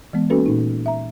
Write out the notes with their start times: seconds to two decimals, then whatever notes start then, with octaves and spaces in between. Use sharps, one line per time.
0.13 E3 G#3 B3
0.30 A#3 C#4 F#4 A4 B4
0.46 A#2 D#4
0.86 E5 A#5